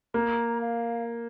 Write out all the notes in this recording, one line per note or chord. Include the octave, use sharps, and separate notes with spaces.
A#3 A#5
F5